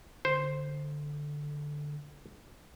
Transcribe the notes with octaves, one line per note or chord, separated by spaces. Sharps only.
D3 C5